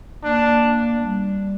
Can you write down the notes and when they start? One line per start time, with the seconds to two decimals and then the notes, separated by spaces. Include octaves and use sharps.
0.24 A#3 D4
1.03 G3